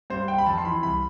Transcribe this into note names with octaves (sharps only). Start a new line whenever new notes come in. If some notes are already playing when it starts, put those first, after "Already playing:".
G2 C5
G3 G5
B5
F2 A5
C6
E3 B5
C2 B5